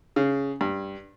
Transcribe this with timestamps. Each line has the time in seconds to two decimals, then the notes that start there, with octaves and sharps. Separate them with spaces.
0.16 C#3
0.61 G2